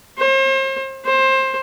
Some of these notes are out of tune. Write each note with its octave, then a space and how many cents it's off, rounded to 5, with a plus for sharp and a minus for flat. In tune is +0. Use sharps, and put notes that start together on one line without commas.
C5 +40
C5 +20